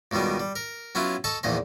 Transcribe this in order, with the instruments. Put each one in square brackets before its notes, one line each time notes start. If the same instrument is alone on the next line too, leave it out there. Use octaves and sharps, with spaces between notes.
[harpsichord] C#2 B2 D#3 G3 B3
G3
A#4
F#3 B3 C#4 E4 F4
A4 D#5 A5 C#6
A#1 E2 A#2 D#3 D#5